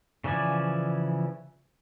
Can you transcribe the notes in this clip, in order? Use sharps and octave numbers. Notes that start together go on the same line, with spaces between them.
C#3 E3 F3 D5 G#5